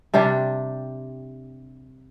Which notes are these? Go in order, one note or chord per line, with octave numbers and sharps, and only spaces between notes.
C3 G3 D4 G4